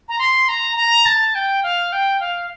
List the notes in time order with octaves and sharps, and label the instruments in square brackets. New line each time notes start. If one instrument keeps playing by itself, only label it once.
[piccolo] A#5
C6
A#5
A#5
A5
G5
F5
G5
F5